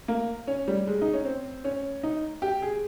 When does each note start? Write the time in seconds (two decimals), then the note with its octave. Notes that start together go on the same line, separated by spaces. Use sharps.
0.08 A#3
0.47 C#4
0.68 G3
0.87 G#3
1.02 D#4
1.13 C#4
1.25 C4
1.64 C#4
2.03 D#4
2.42 G4
2.62 G#4